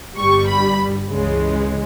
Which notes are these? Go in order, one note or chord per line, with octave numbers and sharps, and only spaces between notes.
G1 G2 G3 C#6
B5
C#2 C#3 E3 G#3